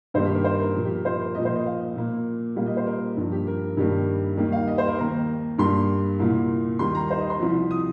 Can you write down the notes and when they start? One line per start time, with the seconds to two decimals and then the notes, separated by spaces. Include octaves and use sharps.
0.14 G2 D#3 G3 A#3 C5
0.25 G4
0.34 A#4
0.44 C5
0.60 A#4
0.75 A#2 F3 A#3
0.85 G4
0.95 A#4
1.05 C5
1.20 A#4
1.35 A#2 F3 A#3 D#5
1.45 C5
1.56 D#5
1.66 F5
1.96 A#2 A#3
2.56 A#2 G3 A#3 F5
2.66 D#5
2.77 C5
2.87 A#4
3.17 G2 F3 A#3
3.32 G4
3.47 A#4
3.77 G2 D#3 G3 A#3
4.37 D#2 D#3 G3 A#3
4.52 F5
4.68 D#5
4.78 C5
4.88 A#4
4.98 D#2 D#3 A#3 A#5
5.58 G2 G3 A#3 C6
6.20 C2 A#2 A#3
6.79 D#2 D#3 G3 A#3 C6
6.95 A#5
7.11 C5
7.20 D#5
7.30 C6
7.40 C2 C3 F3
7.71 D#6